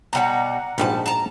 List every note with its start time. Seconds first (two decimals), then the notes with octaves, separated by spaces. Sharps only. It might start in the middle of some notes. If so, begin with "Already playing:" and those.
0.13 B2 G3 D#4 F#5 A#5
0.78 A#1 G#2 B2 G3 D#4 A5
1.06 A5 A#5